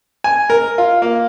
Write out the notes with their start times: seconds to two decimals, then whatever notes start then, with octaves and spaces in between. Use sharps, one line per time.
0.24 G#5
0.50 A#4
0.78 F4
1.02 A#3